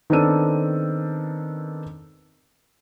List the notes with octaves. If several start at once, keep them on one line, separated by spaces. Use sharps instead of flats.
D#3 B3 C4 D4 A4 D#7